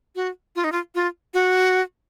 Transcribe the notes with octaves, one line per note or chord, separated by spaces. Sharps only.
F#4
F4
D#4
F4
F4
F#4